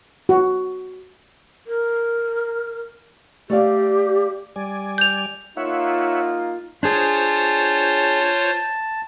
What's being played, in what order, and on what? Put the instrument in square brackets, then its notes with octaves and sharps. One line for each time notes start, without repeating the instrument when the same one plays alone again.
[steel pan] F#4
[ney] A#4
[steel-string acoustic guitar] A3 D5 F5 [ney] G4
[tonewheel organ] G3 D5 G#5
[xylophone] G6 F7
[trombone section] A#3 D#4 F4 [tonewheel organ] C#5 E5 F#5
[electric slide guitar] D4 G#4 [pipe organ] F4 C5 C#5 [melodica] A5